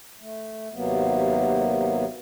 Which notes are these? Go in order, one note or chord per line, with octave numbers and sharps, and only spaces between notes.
A3
D#2 C3 F#3 A#3 B3